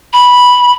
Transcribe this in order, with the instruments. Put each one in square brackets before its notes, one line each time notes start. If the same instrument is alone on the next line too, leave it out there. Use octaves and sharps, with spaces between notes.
[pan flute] B5